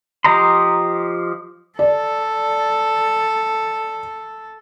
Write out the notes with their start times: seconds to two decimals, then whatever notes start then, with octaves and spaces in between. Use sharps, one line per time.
0.24 F3 G4 D#5 A#5 C6
1.79 A4 D5